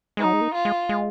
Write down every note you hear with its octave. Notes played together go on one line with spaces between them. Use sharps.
G#3 D#4
F#3
G#3
A#3
F4
G#3
G#3